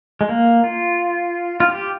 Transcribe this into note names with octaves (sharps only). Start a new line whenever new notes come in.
G#3
A#3
F4
F4
G4